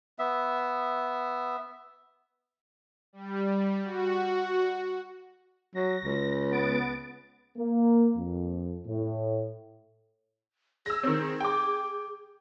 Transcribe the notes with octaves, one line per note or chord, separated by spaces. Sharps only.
B3 E5
G3
F#4
F#3 A#6
C#2
B3 A6 D7
A#3
F2
A2
G#4 E6 A#6
D#3 C4
G5 D6